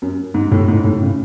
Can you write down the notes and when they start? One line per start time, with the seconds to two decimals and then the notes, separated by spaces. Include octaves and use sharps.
0.02 F#2
0.34 G#2
0.52 A2
0.68 G#2
0.84 A2
1.02 C#3